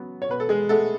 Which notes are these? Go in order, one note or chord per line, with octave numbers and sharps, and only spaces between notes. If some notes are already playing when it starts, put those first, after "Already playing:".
Already playing: C#3 F#3 B3
C#5
B2 B4
A4
G#3 G#4
G#3 A3 B3 A4